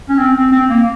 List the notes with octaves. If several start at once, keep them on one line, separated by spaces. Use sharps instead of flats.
C#4
C4
C4
C4
A#3